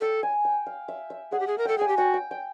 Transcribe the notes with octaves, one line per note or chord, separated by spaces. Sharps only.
A4 G5
G#5
G5
F5
E5
E5
G#4 F#5
G4
G#4
A#4
A4 G5
G#4 G#5
G4
F#4 G5
G5
G5